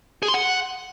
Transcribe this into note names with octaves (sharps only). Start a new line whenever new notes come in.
G#4
C6
F#5